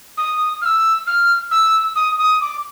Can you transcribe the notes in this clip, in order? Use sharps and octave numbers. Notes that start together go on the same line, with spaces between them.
D#6
F6
E6
F6
E6
D#6
D#6
D6